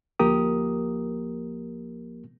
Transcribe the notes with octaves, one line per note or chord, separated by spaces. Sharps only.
D2 F3 A#3 G4 A#4 D#6